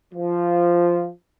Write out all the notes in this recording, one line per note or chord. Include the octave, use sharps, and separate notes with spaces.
F3